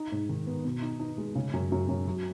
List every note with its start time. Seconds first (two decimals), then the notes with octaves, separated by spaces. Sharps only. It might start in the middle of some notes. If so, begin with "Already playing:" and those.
Already playing: D#4
0.12 G#2
0.29 D#3
0.47 B3
0.65 B2
0.82 D#4
1.00 D#4
1.18 G#3
1.35 C#3
1.53 F#2
1.72 F#2
1.89 F#2
2.07 F#3